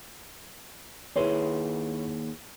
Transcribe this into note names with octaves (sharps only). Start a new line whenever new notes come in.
D#2 E4 G#4 B4 C#5 C6